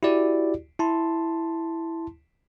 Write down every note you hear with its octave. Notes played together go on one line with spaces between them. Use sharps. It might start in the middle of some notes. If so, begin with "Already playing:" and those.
E4 F#4 G4 D5
E4 A5 C6